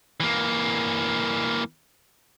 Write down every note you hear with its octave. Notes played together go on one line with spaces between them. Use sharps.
E3 A#3